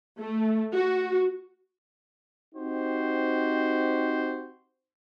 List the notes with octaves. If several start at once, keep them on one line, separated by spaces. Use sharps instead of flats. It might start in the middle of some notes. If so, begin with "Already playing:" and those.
A3
F#4
C4 D#4 F#4 G4 C5